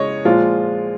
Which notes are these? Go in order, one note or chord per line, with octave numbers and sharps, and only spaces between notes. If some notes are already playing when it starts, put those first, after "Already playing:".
Already playing: C#3 G#3 C#5 D#5
A#2 F3 G#3 F4